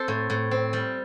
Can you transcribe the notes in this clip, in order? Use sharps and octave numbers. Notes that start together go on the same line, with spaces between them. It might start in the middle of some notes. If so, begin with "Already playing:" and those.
Already playing: C4 A4 C5
A2
A2
C4
G3